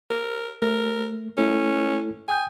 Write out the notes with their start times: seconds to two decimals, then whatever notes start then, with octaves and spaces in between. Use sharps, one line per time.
0.10 A#4
0.62 A3 A#4
1.38 A3 C#4 E4 A4
2.28 G5 G#5 D#6 G6